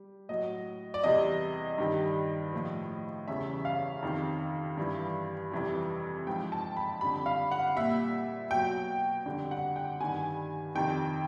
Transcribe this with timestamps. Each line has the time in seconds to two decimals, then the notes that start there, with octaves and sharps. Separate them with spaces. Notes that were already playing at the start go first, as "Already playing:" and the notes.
Already playing: G3
0.29 A2 F#3 D#5
0.94 D5
1.04 E2 C3 E3 G3 D#5
1.78 G2 D#3 G3
2.53 A2 F3
3.27 E2 C#3 E3 G3 E5
3.65 F5
4.02 F2 C3 D#3
4.77 G2 E3 G3
5.52 F2 C3 E3 G3
6.26 G#2 F3 G5
6.52 A5
6.77 B5
7.01 F2 D3 G3 B5
7.26 F5
7.51 F#5
7.76 A#2 G3 E5
8.51 B2 F#3 G5
9.26 F2 D3 G3
9.51 F#5
9.76 G5
10.00 G2 D#3 G3 G#5
10.75 F2 C3 D#3 G5